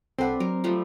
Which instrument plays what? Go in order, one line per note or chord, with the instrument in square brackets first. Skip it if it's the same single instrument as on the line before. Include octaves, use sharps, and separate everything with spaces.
[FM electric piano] C2 A4 F#5 [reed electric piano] C4 [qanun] D4 B4 C5
[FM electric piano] F#3 [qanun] A#4
[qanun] F3 G3 A3